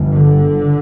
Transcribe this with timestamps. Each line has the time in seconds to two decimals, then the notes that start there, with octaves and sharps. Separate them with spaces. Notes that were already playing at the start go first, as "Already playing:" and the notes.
Already playing: G1 G2
0.12 D3